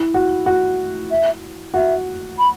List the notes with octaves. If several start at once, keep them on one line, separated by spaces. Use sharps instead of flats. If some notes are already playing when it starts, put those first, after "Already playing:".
Already playing: E4
F#4
F#4
E5
F#4 E5
B5